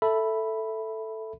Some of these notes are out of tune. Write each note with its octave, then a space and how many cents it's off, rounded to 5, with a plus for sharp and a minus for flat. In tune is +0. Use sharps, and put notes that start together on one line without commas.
A4 +5 E5 +0 B5 -5